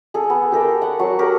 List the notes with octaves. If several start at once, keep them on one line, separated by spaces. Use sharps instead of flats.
G#4 A4
B3
G4 A4 A#4 G5
F#5 C#6
F#3 C#6
G4 A4 A#4